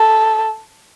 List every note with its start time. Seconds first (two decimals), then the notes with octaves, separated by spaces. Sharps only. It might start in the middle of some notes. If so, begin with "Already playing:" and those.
Already playing: A4